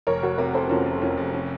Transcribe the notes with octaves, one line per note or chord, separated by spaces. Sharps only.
F1 A#4 C#5
F1 F#4 A#4
C3 A#4 C#5
C3 A4 C5
F1 C#4 F4
F1
F2 C#4 F4
F1
C#4